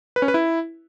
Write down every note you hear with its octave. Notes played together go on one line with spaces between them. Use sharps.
B4
C#4
B4
E4